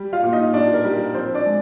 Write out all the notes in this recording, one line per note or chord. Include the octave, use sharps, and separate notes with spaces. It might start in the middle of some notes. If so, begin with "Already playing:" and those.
Already playing: G3
F4 F5
A#2
D#4 D#5
A#2 D4 D5
A#4
G3
A#4
F3 C4 C5
D4 D5
G#3